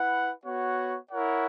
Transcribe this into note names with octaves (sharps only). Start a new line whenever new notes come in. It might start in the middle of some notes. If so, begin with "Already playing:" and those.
Already playing: E4 B4 F#5
B3 F#4 C#5 F#5
E4 A#4 C#5 F#5